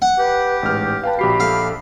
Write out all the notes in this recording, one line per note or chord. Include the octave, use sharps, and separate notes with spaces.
F#5
G4 B4
A1 G#2 F6
B4 F5 G5 A5
A#1 F#4 G4 B5 C7
A4 F5